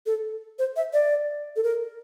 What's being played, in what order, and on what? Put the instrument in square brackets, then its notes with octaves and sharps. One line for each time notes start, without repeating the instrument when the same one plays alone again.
[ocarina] A4
C5
E5
D5
A4
A#4